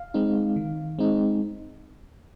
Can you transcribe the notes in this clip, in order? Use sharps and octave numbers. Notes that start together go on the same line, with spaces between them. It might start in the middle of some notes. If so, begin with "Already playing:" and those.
Already playing: F5
G#3 C4 D#4
D#3
G#3 C4 D#4